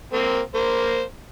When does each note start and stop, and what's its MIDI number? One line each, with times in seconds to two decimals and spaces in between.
0.13 0.40 58
0.13 0.40 60
0.55 1.03 58
0.55 1.03 72